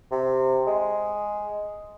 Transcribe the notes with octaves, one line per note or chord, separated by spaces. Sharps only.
C3
G#3